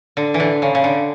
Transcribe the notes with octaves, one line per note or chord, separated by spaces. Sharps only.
D3
E3
D3
C#3
C#3
D3